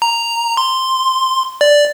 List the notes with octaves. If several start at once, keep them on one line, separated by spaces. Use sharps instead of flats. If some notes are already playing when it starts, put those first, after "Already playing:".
A#5
C6
D5